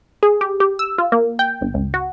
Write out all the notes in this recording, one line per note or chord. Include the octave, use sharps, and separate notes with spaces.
G#4
G4
G4
E6
F4
A#3
G5
G1
C#2
F#4